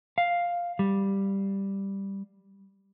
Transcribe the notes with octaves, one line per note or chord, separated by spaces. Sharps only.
F5
G3